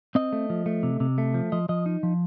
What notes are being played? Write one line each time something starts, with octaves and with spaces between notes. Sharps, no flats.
C4 D#5
A3
F3
A3
C3
C3
A3
F3
F3 D#5
F3 D#5
D#4
F3